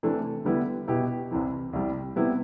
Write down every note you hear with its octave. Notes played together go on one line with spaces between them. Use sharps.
C3 E3 A3 D4
D3 G3 B3 E4
B2 B3 E4 G4
C2 C3 E3
C2 C3 G3
C3 G3 B3 E4